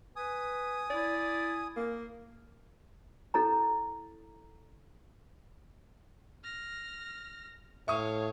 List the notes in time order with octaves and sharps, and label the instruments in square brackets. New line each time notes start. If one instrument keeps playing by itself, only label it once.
[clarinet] B4 [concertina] G#5 D#6
[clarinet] E4 [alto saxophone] D5
[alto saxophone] A#3
[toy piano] E4 A4 C#5 A#5
[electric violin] F6 A#6
[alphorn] A2 [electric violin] C#5 F5 [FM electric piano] E5 [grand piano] C#6 D#6